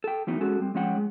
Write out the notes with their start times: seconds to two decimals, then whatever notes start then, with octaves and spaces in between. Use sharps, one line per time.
0.04 A4 G5
0.27 E3 F#3 A3 B3 D#4
0.40 G#3 C#4 F#4 A4
0.59 G3 C4
0.75 F3 G#3 C#4 C#5 F#5 G5
0.97 G#3